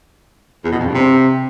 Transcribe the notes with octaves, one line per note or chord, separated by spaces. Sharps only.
E2
B2
F2
G2
C3